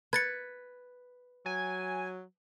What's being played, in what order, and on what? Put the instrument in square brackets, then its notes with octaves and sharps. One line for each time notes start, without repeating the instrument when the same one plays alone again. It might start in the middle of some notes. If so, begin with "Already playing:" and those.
[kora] B4 [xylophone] G#6 A6 C#7
[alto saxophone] F#3 [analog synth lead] G#5